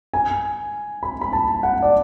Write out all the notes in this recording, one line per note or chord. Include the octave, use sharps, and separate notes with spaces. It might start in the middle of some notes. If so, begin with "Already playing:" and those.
G#5
B5
B5
A5
F#5
D5